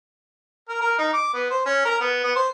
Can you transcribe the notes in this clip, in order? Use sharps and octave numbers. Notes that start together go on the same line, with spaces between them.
A#4
A#4
D#4
D6
B3
C5
C#4
A#4
B3
B3
C5